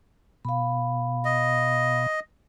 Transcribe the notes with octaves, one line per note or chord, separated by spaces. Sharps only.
B2 F5 B5
D#5